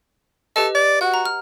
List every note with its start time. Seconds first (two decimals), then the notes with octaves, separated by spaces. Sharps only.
0.56 G4 A4 B4 D#5
0.75 D5
1.01 F#4 F#5
1.14 A#5
1.25 F6